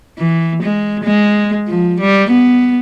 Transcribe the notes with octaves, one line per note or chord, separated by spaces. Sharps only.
E3
G#3
G#3
F3
G3
B3